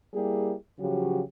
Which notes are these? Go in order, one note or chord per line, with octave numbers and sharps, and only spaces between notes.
G3 A#3 E4 G4 G#4
C#3 F3 F#3 F#4 G4